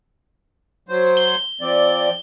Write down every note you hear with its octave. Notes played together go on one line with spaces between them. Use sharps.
F#3 C5
G7
F3 C4 D5